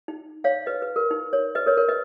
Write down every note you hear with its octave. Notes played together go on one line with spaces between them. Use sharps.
D#4
C#5 F5
B4 D#5
B4
A#4
D#4
A#4 C#5
B4 D#5
A#4 C#5
A#4 C#5
B4 D#5